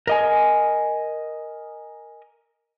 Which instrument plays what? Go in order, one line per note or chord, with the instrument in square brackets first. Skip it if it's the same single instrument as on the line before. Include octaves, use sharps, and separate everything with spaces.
[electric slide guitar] A#4 D#5 G#5